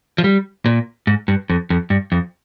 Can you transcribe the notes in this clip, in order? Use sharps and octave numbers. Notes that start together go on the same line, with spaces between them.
F3
G3
A#2
G#2
G2
F2
F2
G2
F2